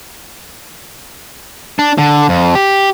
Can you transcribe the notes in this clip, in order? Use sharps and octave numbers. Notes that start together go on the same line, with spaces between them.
D4
D3
F2
G4